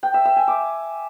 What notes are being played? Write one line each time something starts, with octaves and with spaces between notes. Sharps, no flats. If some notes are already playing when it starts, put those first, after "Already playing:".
G5
E5
E5
G#5
D6